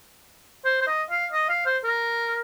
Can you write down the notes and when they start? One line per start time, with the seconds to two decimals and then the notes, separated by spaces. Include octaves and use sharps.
0.65 C5
0.81 C5
0.87 D#5
1.10 F5
1.32 D#5
1.49 F5
1.66 C5
1.84 A#4